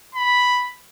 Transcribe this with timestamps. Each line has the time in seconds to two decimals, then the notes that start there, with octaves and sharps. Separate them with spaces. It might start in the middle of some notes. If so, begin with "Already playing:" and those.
0.15 B5